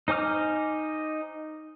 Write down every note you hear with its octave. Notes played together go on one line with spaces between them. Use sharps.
D#4 C5 G#5 D6 F6